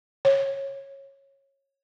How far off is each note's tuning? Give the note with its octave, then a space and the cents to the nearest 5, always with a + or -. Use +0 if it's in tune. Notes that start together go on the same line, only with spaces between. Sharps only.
C#5 -15